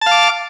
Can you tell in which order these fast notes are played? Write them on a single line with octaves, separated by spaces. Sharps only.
A5 F5 D6